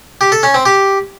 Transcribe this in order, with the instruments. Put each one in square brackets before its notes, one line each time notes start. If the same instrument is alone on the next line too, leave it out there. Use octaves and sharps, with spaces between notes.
[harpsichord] G4
A4
C#4
C4
G4